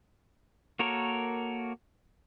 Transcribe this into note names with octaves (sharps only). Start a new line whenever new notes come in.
A#3 F#4 A4 A#4 C#5